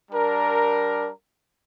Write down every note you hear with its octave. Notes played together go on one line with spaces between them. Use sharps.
G3 D4 A#4